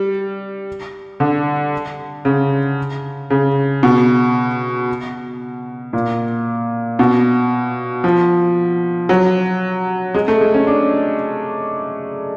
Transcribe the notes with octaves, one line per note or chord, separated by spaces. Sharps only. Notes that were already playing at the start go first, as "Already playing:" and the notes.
Already playing: G3
D3
C#3
C#3
B2
A#2
B2
F3
F#3
G#3
A3
G#3
C#4
D4